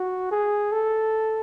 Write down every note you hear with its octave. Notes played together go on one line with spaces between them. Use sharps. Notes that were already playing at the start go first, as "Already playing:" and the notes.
Already playing: F#4
G#4
A4